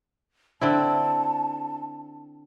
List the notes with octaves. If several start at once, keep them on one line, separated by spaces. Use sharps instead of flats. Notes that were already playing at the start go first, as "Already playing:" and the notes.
D3 C4 E4 A5